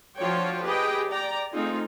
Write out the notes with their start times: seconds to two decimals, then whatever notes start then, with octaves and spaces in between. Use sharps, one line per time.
0.18 F3 D4 F4 F#4 C#5 G5
0.62 G4 G#4 B4 D#5 G5
1.10 D5 G5 A#5
1.53 A3 C4 D#4 F4 G#4